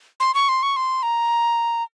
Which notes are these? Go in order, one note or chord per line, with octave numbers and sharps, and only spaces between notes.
C6
C#6
C6
C#6
C6
A#5